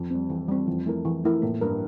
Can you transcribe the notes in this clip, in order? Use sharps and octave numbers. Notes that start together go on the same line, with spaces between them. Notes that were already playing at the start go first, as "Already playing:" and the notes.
Already playing: F2
G3 C4
E3
G3 C4
F2 E3
A3 E4 A#4
E3
A3 E4 A#4
A2 A#3
G2 E4 A#4